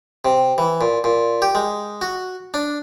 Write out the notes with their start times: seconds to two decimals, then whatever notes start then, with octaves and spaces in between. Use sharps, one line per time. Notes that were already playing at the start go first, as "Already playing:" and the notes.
0.25 C3
0.58 E3
0.81 A#2
1.04 A#2
1.42 G4
1.55 G#3
2.01 F#4
2.54 D4